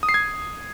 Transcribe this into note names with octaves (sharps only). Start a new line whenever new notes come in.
D#6
C7
G#6